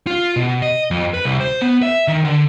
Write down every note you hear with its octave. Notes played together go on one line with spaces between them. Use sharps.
F4
B2
D#5
F2
B4
C2
C5
B3
E5
D#3
D3